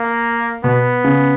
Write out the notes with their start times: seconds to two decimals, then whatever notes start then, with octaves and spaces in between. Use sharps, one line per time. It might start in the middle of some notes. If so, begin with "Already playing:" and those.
Already playing: A#3
0.64 B2 B3
1.05 C#3